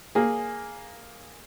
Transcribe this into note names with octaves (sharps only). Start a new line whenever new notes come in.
A#3 G#4